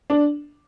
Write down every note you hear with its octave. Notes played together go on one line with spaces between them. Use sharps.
D4